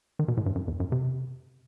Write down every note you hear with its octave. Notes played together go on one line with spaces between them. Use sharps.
D#3
B2
A2
G2
F#2
E2
F#2
C3